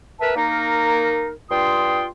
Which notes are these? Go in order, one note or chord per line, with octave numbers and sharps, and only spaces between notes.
A#4 B4 E5 A5
A#3 D#4 A#4
G2 F4 G5 C6 D#6